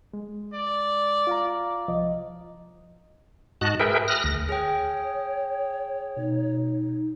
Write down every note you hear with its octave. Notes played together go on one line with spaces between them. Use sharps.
G#3
D5
F4 F5 A#5
C2 F3 D#5
G#2 F#4 D#5 A5 F#6
G#4 A#4 B4 E5 G5
D#6 F6 F#6 A#6
D2 A#6
G#4 C#5 G5
B2 D#4